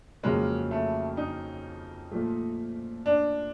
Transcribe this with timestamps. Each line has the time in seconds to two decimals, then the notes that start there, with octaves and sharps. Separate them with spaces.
0.23 F2 C#3 F#3 G#3 A#3 C#4
0.71 A3
1.17 D#4
2.11 A#2 F3 A3
3.06 D4